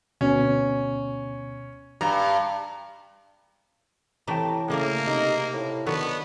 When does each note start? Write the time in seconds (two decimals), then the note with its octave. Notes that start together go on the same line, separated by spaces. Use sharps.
0.21 D2 B2 C#4
2.01 G2 A#5
4.28 A2 C3 E3 A3 G5 A5 A#5
4.70 C#3 A3 A#3 A#4 D5 D#5
5.07 C3 D#4
5.54 A2
5.86 D3 D#3 F#3 B3